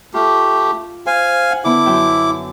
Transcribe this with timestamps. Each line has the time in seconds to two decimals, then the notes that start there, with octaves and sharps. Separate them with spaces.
0.14 A3 F4 G4
1.06 C5 F5 G#5
1.50 F#5
1.64 D3 B3 E4 D6
1.86 F#2 E5 G5